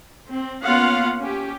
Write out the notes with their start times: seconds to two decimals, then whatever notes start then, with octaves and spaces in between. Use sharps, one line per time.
0.29 C4
0.62 A#3 B3 C#4 F4 F5 F#5
1.21 C#4 G4